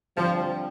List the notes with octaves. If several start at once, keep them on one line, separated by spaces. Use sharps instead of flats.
D3 F3 G3 C4 G4